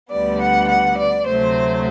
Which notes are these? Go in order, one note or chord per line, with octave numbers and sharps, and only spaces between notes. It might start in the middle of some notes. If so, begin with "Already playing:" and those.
D2 D3 G3 B3 D5
F#5
F#5
D5
D2 C3 F#3 A3 C5